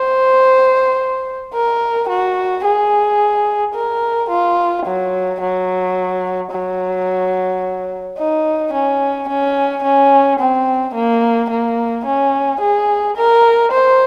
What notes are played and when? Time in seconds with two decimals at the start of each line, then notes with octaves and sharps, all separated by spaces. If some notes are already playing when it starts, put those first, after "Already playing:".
Already playing: C5
1.53 A#4
2.09 F#4
2.64 G#4
3.75 A#4
4.29 F4
4.85 F#3
5.41 F#3
6.52 F#3
8.18 D#4
8.73 C#4
9.29 C#4
9.84 C#4
10.39 C4
10.95 A#3
11.50 A#3
12.06 C#4
12.61 G#4
13.16 A#4
13.71 C5